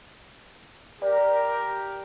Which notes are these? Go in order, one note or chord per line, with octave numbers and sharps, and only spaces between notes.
G4 A#4 D5